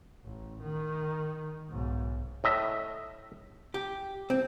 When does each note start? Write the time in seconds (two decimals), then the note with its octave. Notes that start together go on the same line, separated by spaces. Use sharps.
0.24 A1
0.61 D#3
1.69 B1 G#2
2.44 A2 D#5 E5
3.74 G4
4.30 C4